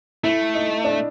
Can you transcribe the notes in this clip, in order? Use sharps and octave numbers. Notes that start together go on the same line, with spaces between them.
A3 E4
D#4
D4